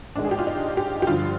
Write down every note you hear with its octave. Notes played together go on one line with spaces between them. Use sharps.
A#1 G#2 D#3 G#3 D4
G#4
G4
F4
D#4
G4
G4
G2 D3 F3 F4